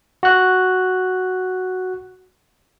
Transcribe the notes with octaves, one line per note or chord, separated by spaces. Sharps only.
F#4 F#6